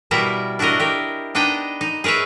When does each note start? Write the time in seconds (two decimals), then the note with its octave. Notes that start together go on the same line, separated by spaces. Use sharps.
0.11 B2 G3 E4 A#4 E5
0.59 D4 E4 F#4 A#4 D#5
0.80 G4 A#4
1.35 B3 D4 D#4 D#5 G5
1.81 D#4
2.04 G#4 A#4 B4 C#5 E5